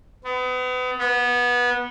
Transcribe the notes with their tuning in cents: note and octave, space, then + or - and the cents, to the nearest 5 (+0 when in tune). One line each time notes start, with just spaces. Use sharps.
B3 +35
B3 -20